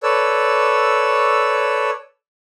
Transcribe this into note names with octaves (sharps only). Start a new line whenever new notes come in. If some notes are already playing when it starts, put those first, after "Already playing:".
A4 B4 C#5 D5 E6